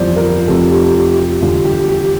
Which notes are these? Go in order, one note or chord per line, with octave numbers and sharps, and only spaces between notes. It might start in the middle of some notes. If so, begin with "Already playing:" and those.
Already playing: G1 F2 E3 G3 C5 D5
A#4
F1 F2 C3 F3 A4
G4
G4
G4
E2 D3 G3 F4
G4
G4